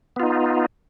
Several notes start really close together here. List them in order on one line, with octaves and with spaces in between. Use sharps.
B3 F4 D#4